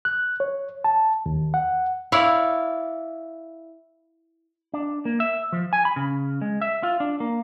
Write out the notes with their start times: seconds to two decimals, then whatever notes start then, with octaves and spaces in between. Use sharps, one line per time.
0.05 F#6
0.40 C#5
0.84 A5
1.26 D#2
1.54 F#5
2.12 E4 C#5 D5 F5
4.74 D4
5.05 A#3
5.20 E5
5.52 F3
5.73 G#5
5.85 B5
5.96 C#3
6.41 G#3
6.61 E5
6.83 F4
7.00 D4
7.20 A#3